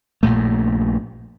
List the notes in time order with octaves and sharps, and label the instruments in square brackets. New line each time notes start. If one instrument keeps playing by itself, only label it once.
[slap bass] A#1 G2 A#2 A3